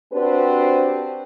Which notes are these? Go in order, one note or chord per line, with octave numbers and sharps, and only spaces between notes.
C4 D4 F#4 G4 B4 C5